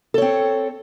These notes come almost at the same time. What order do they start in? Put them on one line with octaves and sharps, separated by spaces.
A4 C#5 C4